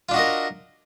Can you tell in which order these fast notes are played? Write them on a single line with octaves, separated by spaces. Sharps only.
F4 D4 F#4 D#5 A#4